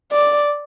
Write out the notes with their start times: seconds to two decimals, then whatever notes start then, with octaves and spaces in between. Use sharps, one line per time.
0.12 D5